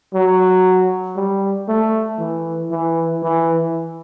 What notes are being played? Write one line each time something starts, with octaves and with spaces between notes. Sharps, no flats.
F#3
G3
A3
E3
E3
E3